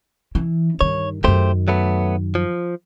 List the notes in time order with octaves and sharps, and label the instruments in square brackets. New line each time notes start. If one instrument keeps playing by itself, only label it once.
[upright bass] E3
[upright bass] G2 D#3 [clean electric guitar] C#5
[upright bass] F#2 D#3 [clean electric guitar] A3 G4 C5
[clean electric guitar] F#3 A3 B3
F3